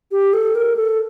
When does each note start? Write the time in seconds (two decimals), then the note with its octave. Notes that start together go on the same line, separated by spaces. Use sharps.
0.12 G4
0.33 A4
0.55 A#4
0.76 A4